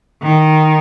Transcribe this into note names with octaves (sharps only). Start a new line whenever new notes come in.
D#3